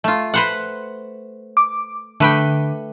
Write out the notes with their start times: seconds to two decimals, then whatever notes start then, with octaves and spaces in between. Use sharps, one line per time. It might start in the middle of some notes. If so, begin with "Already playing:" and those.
0.04 A3 F4
0.34 B4 C5 F#5
1.57 D6
2.20 D3 A3 B4 G5